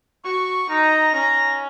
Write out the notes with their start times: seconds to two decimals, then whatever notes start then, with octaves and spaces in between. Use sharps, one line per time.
0.24 F#4 C#6
0.69 D#4 A#5
1.14 C#4 A#5